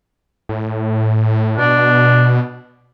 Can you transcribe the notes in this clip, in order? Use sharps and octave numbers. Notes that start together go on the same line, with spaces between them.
A2
B2 D4